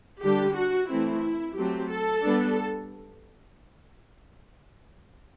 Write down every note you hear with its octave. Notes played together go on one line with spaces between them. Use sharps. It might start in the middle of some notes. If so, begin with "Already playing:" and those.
D3 G3 D4 G4
F#4
E3 A3 C4 E4
F#3 A3 C4 G4
A4
G3 B3 D4